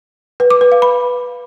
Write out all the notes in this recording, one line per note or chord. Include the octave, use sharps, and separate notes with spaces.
B4
D6
B4
F5
B5